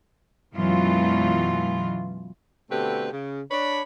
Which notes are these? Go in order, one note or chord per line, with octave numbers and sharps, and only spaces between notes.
F#2 B2 E3 G#3 F4
B2 D3 A3 C4 G4 B4
C#3
D4 C#5 B5